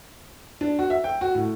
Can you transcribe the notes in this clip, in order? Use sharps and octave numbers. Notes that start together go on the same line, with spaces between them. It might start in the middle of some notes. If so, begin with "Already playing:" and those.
D4
F#4
E5
G5
F#4
A2